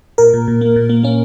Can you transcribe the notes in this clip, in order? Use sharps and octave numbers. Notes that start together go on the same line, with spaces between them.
A#2 A#4
A#2
A#2
A#3
A#2
A#3
A#3 C#4